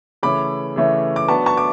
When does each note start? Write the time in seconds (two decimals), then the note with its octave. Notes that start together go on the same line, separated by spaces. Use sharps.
0.23 C#3 E3 A3 C#4 B5 D6
0.76 C#3 E3 A3 C#4
1.16 D6
1.28 F#3 B3 D4 A5 C#6
1.46 A5 C#6
1.57 D6